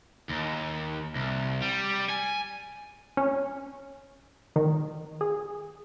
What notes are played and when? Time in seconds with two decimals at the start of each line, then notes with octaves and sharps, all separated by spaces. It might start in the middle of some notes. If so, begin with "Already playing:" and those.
0.29 D#2
1.16 C2
1.62 G3
2.09 G#5
3.17 C#4
4.56 D#3
5.21 G#4